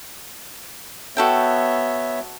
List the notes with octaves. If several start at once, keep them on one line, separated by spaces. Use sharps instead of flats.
B3 F#4 A4 C#5 E5 G5